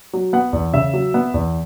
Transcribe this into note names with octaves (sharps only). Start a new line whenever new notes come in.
F#3
B3 F#5
E2
C#3 E5
F#3
B3
E2